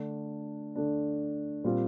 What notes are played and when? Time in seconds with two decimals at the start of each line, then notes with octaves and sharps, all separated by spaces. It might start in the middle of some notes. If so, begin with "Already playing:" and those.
Already playing: D3 A3 D4
0.75 D3 A3 D4
1.64 A#2 G3 C4 F4